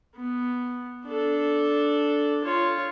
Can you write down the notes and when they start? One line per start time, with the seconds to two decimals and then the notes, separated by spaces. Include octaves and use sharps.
0.16 B3
1.06 D4 A4
2.44 F4 C#5